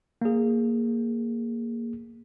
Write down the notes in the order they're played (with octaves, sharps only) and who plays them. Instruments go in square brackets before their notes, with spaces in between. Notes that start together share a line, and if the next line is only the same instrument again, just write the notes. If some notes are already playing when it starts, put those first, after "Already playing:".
[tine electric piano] A#3 G#4